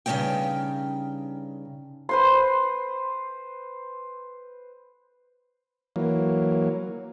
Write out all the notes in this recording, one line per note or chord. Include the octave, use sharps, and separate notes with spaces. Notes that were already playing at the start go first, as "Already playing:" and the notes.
G2 C#3 F#3 A3 D#4 G5
B4 C5 C6
E3 F#3 A#3